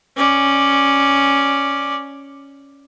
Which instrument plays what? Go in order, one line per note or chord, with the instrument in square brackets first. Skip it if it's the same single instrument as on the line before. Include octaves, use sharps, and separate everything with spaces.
[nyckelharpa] C#4 D5